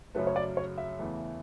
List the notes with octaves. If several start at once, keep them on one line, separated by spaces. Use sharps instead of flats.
F#2 C#3 F#3 A3 B4
C#5
D5
C#5
E5
E2 C#3 E3 A3